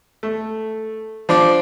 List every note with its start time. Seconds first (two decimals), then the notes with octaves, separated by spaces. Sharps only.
0.23 A3
1.29 F3 D4 D5